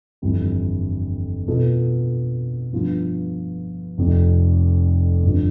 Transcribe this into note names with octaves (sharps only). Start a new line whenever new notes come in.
G1 F2 E3 G3
B2 B3 F4 A4
G2 F3 B3 F4
F1 F2 C3
G1 G2 F3